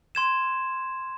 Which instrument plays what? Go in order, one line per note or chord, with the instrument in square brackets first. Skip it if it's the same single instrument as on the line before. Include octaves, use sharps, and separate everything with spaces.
[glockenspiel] C6 G#6 E7